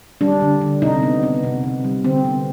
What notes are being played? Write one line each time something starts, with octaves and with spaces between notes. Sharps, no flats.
G3 D4
D3
D3
C3 D#4
B3
B3
C3
C3
G3
D3 C4
B3